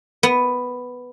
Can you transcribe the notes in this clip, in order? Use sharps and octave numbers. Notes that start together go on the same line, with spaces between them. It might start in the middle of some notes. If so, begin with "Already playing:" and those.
B3